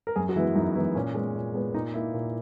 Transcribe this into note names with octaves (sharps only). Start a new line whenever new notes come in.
A#4
F#2 G#4
F#4
E3 G#3 B3 E4
F#2 D#4
E3 G#3 B3 E4
A#2 C#4
G#3 B3
A#2
G#3 B3
A#2 D#4
A#3 E4
A#2